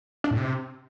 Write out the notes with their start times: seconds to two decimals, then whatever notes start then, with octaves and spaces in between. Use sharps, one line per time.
0.24 D4
0.31 A2
0.37 C3